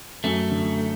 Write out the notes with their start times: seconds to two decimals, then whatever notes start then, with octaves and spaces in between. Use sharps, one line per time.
0.24 F#2 A3
0.51 D3